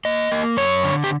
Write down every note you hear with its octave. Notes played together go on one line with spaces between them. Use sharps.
A#3 D#5
A#3
F#2 C#5
D3
G4